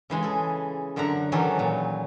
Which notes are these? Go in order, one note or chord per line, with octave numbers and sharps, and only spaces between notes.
C#3 E3 G#3
G#4 A4
F#2 D3 E5 F#5 A#5
D#3 E3 F#3 C#4 G4 A4
A#2